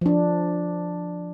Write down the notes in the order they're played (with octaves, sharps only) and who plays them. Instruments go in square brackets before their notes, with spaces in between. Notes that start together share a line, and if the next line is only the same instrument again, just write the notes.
[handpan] F3 D4